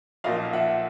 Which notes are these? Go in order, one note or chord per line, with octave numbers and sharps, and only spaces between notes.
B1 A#2 F3 A#3 D#5 F5
E5 F#5